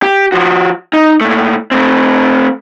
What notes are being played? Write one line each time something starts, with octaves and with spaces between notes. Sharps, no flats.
G4
F3 F#4
D#4
A#2 A3
A3 C4